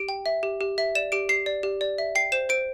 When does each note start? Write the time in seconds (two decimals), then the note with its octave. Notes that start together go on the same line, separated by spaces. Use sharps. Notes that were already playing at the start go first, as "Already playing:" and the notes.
Already playing: G4 D7
0.09 G5
0.26 E5
0.43 G4
0.61 G4
0.78 E5
0.95 D5 E7
1.12 G4 D7
1.29 G4 C7
1.46 D5
1.63 G4
1.81 D5
1.98 E5
2.15 G5 C7
2.32 C5 E7
2.49 C5 D7